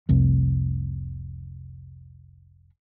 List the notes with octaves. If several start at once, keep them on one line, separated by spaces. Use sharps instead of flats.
F1 C2